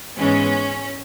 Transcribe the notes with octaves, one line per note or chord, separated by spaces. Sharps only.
G#2 E3 G#3 B3 C#4